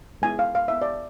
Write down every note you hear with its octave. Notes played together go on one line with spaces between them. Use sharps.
G#3 B3 E4 G#5
F5
F5
B3 E4 E5
D5